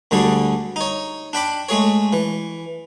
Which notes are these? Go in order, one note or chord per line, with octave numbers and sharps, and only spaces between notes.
D2 D3 G3 G#4 D5
D#4 C#5
D4 G5 B5 D6
G#3 A3 G#4 C#5
E3